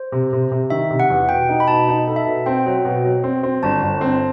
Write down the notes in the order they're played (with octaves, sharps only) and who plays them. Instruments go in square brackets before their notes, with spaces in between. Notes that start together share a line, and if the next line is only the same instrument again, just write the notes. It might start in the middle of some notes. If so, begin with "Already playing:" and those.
Already playing: [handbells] C5
[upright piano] C3
C3
C3
[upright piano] D#3 [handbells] E5
[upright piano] C3
[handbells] F#5
[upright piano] E2
[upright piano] B2 [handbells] G5
[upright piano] D#4
[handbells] B5
[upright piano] B2 [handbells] A5
[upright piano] D#4
A4
[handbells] E5
[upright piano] B2
[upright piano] C4 [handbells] G5
[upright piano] F#3
B2
F#3
C4
C4
[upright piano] G1 [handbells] A5
[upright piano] G1
C4